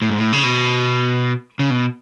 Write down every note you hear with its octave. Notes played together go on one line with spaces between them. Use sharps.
A2
G#2
A2
C#3
B2
C#3
B2